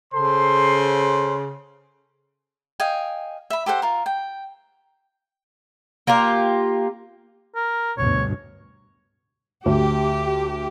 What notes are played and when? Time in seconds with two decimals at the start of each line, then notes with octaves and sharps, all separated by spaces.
0.14 C#3 A4 C5 C6
2.80 D#5 F5 G5 G#5
3.50 E5 B5
3.66 G4 A4 C5 F#5
3.82 F4 A#4
4.06 G5
6.07 A#3 F4 G4 A#4
7.56 A#4
7.98 D2 G2 B2 C#5
9.66 D2 G4